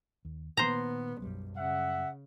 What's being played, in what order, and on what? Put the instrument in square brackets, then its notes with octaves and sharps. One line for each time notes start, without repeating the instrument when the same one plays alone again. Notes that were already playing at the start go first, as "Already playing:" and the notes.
[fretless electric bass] D#2
[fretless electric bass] A#2 D#3 A#3 [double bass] B3 [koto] C5 A#5
[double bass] B1 [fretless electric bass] F#2 G3
[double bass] C#3 [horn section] E5 F#5